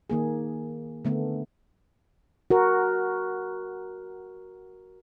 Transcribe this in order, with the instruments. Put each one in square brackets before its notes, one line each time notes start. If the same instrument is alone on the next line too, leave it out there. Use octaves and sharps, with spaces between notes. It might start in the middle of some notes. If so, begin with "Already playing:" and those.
[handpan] D#3 A#3 G#4
D3 A3 B3
F#4 A#4